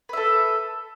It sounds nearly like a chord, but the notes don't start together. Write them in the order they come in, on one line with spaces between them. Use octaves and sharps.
B4 E5 A4